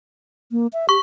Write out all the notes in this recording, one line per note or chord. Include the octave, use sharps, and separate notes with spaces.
A#3
E5
G4 C#6